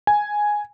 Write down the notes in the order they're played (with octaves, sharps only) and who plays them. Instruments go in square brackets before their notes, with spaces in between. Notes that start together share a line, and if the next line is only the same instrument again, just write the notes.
[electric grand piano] G#5